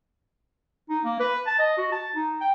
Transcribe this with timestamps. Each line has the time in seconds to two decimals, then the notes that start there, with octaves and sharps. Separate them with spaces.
0.90 D#4
1.04 A#3
1.20 B4
1.47 A5
1.59 D#5
1.77 F#4
1.92 A5
2.15 D#4
2.41 G5